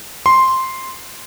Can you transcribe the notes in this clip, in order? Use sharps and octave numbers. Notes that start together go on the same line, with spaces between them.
C6